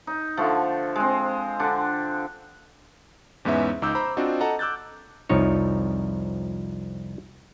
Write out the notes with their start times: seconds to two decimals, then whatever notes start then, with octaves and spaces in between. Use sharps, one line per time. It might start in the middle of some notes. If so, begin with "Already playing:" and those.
0.07 D#4
0.37 D3 F3 A3
0.96 G#3 C4
1.60 D3 D4
3.45 E2 G#2 B3 C#4 E5
3.82 C#2 D#4 D6 E6 G6
3.95 C5 A#5 B5
4.17 C4 D4 F4 F#4 D#5
4.41 A4 D#5 F#5 A5 A#5
4.59 D6 E6 F#6 G6 A6
5.29 C2 F2 F3 D#4 C#5